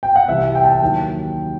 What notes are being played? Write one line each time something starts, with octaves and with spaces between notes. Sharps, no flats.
G5
F#5
C2 C3 E3 G3 E5
G5
A5
G5
D#2 D#3 F#3